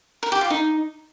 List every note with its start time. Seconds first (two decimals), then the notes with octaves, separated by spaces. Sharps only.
0.23 A#4
0.32 G4
0.41 F4
0.50 D#4